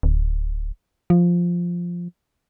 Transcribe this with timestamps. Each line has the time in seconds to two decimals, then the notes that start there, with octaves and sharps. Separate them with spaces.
0.03 D1
1.10 F3